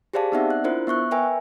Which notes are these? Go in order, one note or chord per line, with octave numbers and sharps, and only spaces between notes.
G4 G#4 C5 D5 F5 A5
B3 C4 D#4 D5 E5 F#5
F#6
D4 E4 F4 A#4 C5
B3 E5 C#6 F#6
A#4 B4 E5 G5 G#5